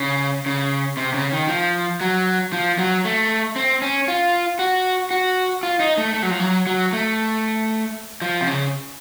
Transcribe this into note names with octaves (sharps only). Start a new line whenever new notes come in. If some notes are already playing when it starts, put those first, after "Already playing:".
Already playing: C#3
C#3
C3
C#3
D#3
F3
F#3
F3
F#3
A3
C4
C#4
F4
F#4
F#4
F4
D#4
A3
A3
F#3
F3
F#3
F#3
A3
F3
C3
C#3